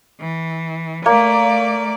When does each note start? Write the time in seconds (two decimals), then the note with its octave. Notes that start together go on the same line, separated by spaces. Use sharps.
0.20 E3
1.06 A3 A#3 D5